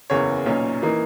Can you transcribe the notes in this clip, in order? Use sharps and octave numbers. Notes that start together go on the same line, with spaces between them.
F#1 E2 C#3 C#5
B1 A#2 A#3 C#4
E3 A#3 D#4